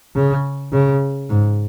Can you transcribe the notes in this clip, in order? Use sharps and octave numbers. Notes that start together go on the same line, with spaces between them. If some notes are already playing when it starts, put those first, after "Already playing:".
C#3
C#3
G#2